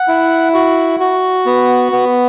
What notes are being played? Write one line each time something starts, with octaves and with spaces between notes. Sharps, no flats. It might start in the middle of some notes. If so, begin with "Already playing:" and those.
Already playing: F#5
E4
F#4
F#4
B3
B3